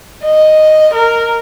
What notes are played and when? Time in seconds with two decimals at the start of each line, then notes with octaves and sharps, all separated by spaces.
0.24 D#5
0.94 A#4